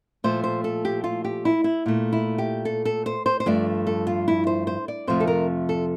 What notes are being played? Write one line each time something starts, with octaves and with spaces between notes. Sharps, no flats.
A#2 F3 A3 C5
C5
A4
G4
F4
G4
E4
E4
A#2 A3
E4
G4
A4
A4
C5
C5
C5
G2 F3 A3 D5
A4
F4
E4
C5
C5
D5
F2 C3 F3 A3 C5
A4
A#4
A4